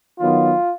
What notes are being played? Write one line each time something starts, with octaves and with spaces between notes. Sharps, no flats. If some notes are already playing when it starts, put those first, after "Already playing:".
D#3 F#3 B3 F4